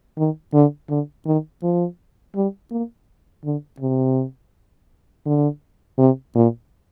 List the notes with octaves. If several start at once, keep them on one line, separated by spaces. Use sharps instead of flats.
D#3
D3
D3
D#3
F3
G3
A#3
D3
C3
D3
C3
A#2